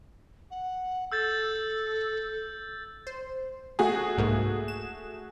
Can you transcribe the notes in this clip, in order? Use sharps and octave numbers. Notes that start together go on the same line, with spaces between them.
F#5
A4 E6 G6 A6
C5
A3 F#4 G#4
C2 G#2 A#3
E7